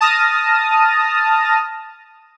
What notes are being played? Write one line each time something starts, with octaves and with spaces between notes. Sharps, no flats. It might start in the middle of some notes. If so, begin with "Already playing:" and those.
A5 D#6 F6 A#6